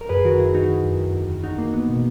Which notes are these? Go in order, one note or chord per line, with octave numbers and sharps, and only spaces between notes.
A#4
F#2 G#4 B4
G#4
D#3 F#4 A#4
F#2 E4 G#4
D#3 D#4 F#4
D#3
F#2
D#3
E2
D#3
E2 D#4 F#4
D#3 A#3
E2 B3
B2